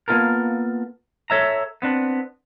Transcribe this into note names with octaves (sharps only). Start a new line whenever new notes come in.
A#3 B3 C#4 F4 A4 A#4
A4 C#5 E5 A#5
B3 C4 D4